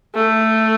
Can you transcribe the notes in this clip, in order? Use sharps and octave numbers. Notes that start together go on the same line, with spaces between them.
A3